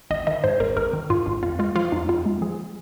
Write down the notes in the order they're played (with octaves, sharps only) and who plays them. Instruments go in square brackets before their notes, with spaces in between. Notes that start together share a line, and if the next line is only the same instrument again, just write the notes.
[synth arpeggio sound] G#1 D#5
D#3 D#5
G#2 C5
G#1 A#4
G#1 A#4
D#3
G#2 F4
G#1
F2 F4
G#3 F4
F3 F4
F2 D#4
F2 F4
G#3
F3 G#4